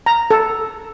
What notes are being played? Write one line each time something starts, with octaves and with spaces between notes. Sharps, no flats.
A#5
A4